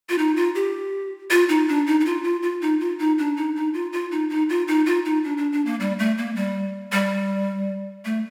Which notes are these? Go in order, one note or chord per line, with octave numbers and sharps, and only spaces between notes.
F4
D#4
F4
G4
F4
D#4
D4
D#4
D#4
F4
F4
F4
D#4
F4
D#4
D4
D#4
D#4
F4
F4
D#4
D#4
F4
D#4
F4
D#4
D4
D4
D4
A#3
G3
A3
A#3
G3
G3
A3